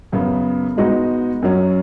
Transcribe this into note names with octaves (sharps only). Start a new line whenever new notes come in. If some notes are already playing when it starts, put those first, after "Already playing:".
F#2 C#3 B3
G#2 G#3 B3 D#4 F#4
F#2 F#3 C#4